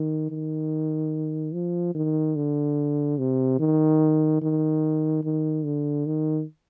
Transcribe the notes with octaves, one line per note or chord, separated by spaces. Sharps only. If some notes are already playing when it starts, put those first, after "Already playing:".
Already playing: D#3
D#3
F3
D#3
D3
C3
D#3
D#3
D#3
D3
D#3